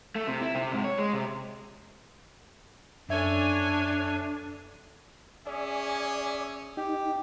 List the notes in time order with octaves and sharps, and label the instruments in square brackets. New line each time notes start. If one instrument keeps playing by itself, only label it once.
[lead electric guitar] A3
C3
E4
C3
G#2
C#5
G#3
C3
[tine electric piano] F#2 E5 [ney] D4 [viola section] A4 C#5 G#5
[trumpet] C#4 [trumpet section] G#4 E5 G#5 [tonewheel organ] D5
[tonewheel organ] D#4 [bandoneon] G4